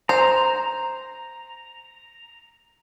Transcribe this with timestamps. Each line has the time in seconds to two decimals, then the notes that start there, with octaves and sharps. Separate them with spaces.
0.09 C5 A#5